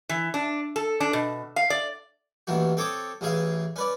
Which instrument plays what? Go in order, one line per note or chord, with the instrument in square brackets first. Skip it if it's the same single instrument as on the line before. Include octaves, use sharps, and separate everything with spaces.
[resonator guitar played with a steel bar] E3
D4
A4
D4
B2
F5
D5
[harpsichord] A1 D#2 E3 F#4
C4 A4 C#5 D6 D#6
A1 C#3 E3 G#4 F5
C#4 B4 D5